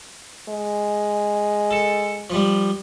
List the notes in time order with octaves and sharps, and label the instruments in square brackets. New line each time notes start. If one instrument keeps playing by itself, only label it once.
[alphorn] G#3
[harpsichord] A4
F3 G3